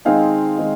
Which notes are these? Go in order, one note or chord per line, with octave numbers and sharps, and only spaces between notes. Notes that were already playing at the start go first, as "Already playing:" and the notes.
D#3 G#3 C4 D#4 F5 G#5
D#3 G#3 C4 D#4